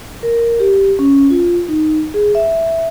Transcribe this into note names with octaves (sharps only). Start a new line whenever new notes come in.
A#4
G4
C#4
F4
D#4
G#4
E5